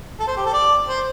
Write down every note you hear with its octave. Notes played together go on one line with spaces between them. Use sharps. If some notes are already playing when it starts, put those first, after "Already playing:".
A4
C5
G4
A4
D5
C5